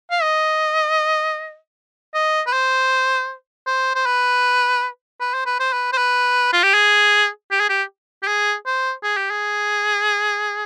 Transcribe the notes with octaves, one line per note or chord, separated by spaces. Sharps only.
F5
D#5
D#5
B4
C5
C5
C5
B4
B4
C5
B4
C5
B4
C5
B4
F4
G4
G#4
G4
G#4
G4
G4
G#4
C5
G#4
G4
G#4